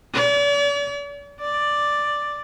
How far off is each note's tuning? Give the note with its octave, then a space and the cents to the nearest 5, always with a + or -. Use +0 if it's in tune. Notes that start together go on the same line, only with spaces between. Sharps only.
D5 -45
D5 +5